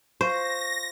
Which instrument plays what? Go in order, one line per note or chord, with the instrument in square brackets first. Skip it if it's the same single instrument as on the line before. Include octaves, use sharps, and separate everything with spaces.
[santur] F4 C#6 [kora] C5 [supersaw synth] A#6